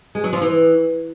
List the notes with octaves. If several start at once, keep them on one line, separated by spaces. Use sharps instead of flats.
G#3
F#3
F3
E3